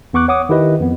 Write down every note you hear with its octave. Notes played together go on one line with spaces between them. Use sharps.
E2 B3 C#6 D6 F#6
C#5 F#5 D6 D#6
D#3 E4 G4 B4 D#5
F2 B3